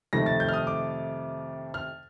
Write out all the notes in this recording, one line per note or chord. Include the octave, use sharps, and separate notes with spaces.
F2 C3 D#3 A3 A#6
A6
G6
F6
D#6
D6
F6